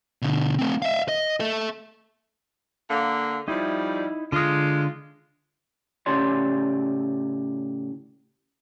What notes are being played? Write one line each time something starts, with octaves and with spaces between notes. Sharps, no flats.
B2 D3
A3 C4
E5 F5
D#5
A4 E5
D3 A#3
F3 G3 D#4 E4
D3 G#3 F4 D#6
A2 C#3 G4 C#5 D5 C6